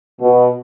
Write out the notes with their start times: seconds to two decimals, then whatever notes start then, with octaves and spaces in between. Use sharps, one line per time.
0.21 B2